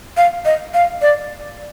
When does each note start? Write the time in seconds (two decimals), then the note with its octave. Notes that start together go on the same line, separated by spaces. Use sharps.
0.17 F5
0.45 D#5
0.74 F5
1.02 D5